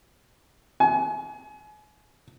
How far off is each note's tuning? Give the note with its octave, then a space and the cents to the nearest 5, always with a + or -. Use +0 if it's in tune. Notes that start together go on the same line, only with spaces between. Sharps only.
G#5 +35